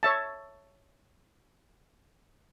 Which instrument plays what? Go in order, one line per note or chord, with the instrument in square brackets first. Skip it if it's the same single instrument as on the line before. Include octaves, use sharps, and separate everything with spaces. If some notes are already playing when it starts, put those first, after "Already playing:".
[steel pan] C#5 E5 A5